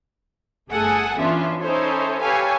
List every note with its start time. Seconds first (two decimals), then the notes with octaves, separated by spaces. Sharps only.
0.71 G1 A3 G#4 A4 F#5 G#5
1.19 E3 B3 C#4 D4 F4 E5
1.61 C#4 D#4 E4 A4 C5 C#5
2.22 G4 A4 B4 C#5 F5 G#5